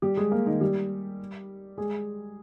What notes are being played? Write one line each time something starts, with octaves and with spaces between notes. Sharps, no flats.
G3 G4
G#3 G#4
A#3 A#4
D#3 D#4
G3 G4
G#3 G#4